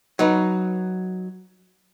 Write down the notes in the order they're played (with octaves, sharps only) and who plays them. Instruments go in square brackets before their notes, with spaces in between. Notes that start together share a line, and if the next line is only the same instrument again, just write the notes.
[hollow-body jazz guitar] F#3 D#4 B4